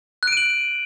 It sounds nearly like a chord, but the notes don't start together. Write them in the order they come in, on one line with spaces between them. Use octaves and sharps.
F#6 D7 D#7 F#7